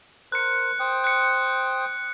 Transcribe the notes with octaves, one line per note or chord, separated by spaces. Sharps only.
A#4 C5 F#6 C#7
C5 G5 D#6
F#6 C#7